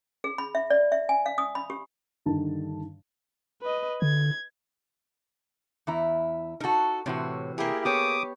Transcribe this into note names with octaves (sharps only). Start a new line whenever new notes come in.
G#4
B5
E5
D5
E5
G#5
F5
D#6
B5
G4
G2 D3 D#3 A5
B4 D#5
D3 G#6
E2 E4 A#5
D#4 F#4 A4 A#4
A2 C3 E3 F#4
A#3 E4 G4 G#4
B3 G4 C#5 D6 D#6